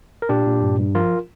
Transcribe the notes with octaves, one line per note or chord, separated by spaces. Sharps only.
A#4
A#2 D4 G4
A#2
G2
G2
F3 F4 A#4